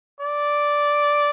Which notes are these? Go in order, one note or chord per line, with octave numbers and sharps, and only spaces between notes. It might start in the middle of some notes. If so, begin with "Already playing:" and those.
D5